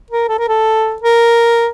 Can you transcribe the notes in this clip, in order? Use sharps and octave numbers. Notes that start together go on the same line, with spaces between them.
A#4
A4
A#4
A4
A#4